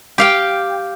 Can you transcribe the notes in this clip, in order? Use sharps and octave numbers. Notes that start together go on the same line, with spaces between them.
G4 F5 G5